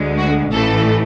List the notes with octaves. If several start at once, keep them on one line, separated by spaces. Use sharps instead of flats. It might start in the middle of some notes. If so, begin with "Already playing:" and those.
Already playing: D2 D3 G#3
F#4
A1 A2 E3 A3 A4